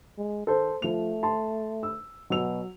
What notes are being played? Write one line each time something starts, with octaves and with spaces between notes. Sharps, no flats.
G#3
D#3 A4 C5
F3 A3 F7
A5 C6
E6
B2 F#3 E6 F7